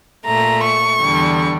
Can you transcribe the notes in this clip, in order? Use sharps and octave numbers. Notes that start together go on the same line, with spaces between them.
A#2 A3 A#5
C#6
E2 D3 G3